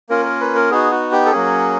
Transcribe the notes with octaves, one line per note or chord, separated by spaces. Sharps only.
A#3 C#4 F4 A#4
A#4
B4
A#4
B3 D#4 F#4 G#4
F#4
G4
A4
F#3 A#3 C#4 G#4